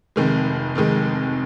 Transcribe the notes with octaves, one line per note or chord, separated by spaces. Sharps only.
F1 F2 D#3 G#3
F1 F2 D#3 G#3